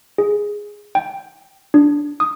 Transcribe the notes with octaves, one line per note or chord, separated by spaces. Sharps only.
G#4
G5
D4
D#6